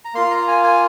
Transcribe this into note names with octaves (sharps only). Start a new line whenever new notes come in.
A#5
A#3 F4 C6
A#5
G#5
G#5